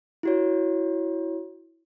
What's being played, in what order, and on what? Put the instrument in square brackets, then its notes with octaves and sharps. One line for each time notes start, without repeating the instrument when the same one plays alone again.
[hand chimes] E4 F#4 C#5